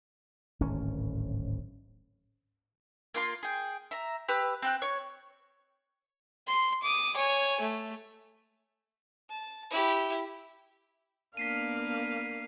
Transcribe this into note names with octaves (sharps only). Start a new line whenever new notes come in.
D1 G#1 C#4
A#3 F4 G5 C6
G#4 G5
E5 A#5
G4 B4 E6 F#6
C4 G5 F#6
C#5 C#6
C6
D6 D#6
C#5 G#5
A3
A5
E4 G4
A#3 B3 D4 F5 B6 C7 D#7